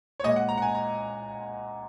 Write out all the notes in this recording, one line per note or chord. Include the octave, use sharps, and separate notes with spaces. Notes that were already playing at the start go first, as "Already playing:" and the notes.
C#5
A#2 G#3 D#5
F#5
A#5
F#5
G#5
A#5